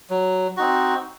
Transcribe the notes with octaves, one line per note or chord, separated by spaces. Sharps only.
F#3
C4 D#4 F#4